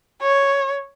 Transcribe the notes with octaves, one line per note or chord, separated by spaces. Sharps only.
C#5